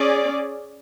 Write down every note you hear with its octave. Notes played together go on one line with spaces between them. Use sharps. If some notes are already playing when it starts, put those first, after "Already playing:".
Already playing: C#4 G#4 D5